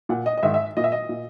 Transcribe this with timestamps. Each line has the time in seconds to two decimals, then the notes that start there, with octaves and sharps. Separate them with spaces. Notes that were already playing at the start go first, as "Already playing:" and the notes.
0.09 A#2 F#5
0.26 D#5
0.37 D#5
0.43 G#2 D#3 E5
0.54 E5
0.77 A#2 D#5
0.84 E5
0.92 D#5
1.09 A#2